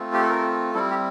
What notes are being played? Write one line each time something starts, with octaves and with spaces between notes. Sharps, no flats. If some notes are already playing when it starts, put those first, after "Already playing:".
Already playing: A3 C4 F4
G4
A4
A#4
G3 C4 E4 A4
G4